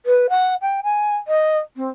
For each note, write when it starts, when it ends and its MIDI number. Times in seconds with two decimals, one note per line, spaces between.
0.06 0.27 71
0.30 0.55 78
0.62 0.81 79
0.83 1.16 80
1.28 1.58 75
1.76 1.88 60